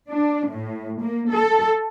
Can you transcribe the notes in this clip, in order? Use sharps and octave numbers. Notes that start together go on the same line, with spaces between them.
D4
A2
A#3
A4